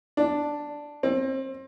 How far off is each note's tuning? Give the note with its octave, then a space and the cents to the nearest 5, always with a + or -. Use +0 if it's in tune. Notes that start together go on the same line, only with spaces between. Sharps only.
D4 +0
C4 +30